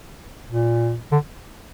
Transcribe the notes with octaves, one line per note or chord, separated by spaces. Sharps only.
A#2
D3